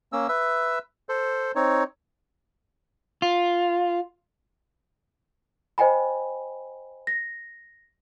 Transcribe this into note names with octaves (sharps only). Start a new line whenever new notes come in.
A#3 C#4 E6
B4 E5 E6
A4 C5
C4 D#4 C#5
F4
C5 D#5 G5 G#5 B5
A#6